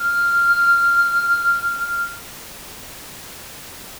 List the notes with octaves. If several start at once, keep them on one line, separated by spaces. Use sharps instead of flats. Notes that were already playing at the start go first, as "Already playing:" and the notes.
Already playing: F6